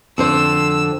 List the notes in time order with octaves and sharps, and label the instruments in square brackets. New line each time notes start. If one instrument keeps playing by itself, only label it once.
[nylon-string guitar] F2 D3 C5 [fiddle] E6